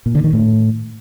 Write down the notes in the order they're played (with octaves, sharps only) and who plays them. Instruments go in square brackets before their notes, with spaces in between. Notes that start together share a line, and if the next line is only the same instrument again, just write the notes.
[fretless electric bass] A#2
D3
D#3
A2